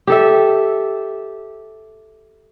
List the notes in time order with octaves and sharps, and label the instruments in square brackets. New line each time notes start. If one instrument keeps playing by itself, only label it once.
[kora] G4 A4 E5